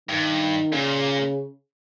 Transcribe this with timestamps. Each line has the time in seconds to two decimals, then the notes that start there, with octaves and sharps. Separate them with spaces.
0.09 G2 D#3
0.73 A#2 C#3